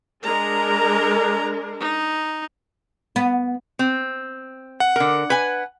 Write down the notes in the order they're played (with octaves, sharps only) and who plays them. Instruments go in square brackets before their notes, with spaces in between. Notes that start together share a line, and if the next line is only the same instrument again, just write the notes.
[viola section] G#3 D4 A#4 [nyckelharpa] A#5
[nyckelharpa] D#4
[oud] B3
[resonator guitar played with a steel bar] C4
[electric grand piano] F#5
[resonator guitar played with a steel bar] D3 A#4
B4 G#5